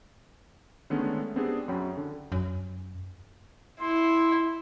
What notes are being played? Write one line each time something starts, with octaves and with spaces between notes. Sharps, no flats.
D3 D#3 G#3 A3 B3 C#4
B3 C4 D4 G4 G#4
F#2 F#3 C#4 G5 B5
D3
F#2
E4 C6